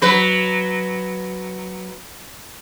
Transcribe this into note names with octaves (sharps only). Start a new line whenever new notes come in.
F#3 B4